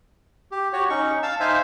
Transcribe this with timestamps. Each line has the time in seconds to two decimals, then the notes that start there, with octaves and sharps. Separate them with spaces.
0.51 G4
0.73 F#4 G4 C#5
0.90 C#4 D#4 C#6
1.23 F5 A5 E6
1.40 D#4 C5 E5 F5 G#5